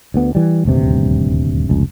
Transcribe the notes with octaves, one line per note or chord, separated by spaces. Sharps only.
D2 B3
E3 G3
D#1 D2 G2 C3
F1 C#2